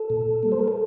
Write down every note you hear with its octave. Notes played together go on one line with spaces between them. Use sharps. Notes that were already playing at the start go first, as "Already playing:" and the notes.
Already playing: A4
A#2
G3 A#3
C5
A#4
A4